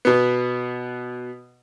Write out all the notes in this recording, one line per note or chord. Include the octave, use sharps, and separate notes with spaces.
B2 B3